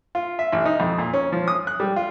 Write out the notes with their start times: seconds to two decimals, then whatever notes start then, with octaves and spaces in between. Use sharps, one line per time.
0.15 F4
0.39 E5
0.52 A1
0.65 D#4
0.80 F2
0.98 A#2
1.13 C#4
1.32 F3
1.48 D#6
1.67 F#6
1.80 G3
1.96 F4